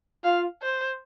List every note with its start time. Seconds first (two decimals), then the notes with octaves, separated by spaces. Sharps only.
0.24 F4 F5
0.62 C5